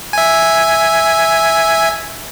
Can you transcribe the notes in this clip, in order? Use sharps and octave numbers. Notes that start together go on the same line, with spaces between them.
E5 G#5